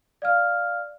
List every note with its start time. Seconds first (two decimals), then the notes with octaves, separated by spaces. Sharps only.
0.22 D5 F5 F6